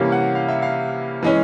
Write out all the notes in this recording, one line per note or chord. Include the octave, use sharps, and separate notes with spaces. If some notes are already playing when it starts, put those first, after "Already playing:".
Already playing: C3 E3 G3 A#3 C#4 F5
F#5
F5
E5
F5
E3 G#3 C#4